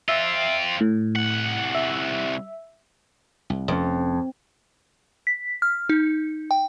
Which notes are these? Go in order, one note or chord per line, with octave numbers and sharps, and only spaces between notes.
C4 F4 E5
A2
C2 F#5
E5
C2
F1 F2 B2 C#4
B6
F6
D#4
G5